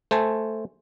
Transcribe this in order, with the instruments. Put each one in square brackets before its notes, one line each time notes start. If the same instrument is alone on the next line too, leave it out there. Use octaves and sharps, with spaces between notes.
[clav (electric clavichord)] A3 C5 G#5 A5